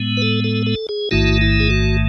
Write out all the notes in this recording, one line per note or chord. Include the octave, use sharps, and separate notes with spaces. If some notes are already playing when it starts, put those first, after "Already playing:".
Already playing: A2 G#3 B3
B4
A4
A4
A4
G#4
A1 G#2 D#3 A3 E4 F#4
E4
G#4
F#4